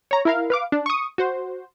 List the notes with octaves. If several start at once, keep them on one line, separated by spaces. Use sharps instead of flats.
C#5 A#5
E4 A#4 F5
B4 F5 D6
D4
C#6 D#6
F#4 C5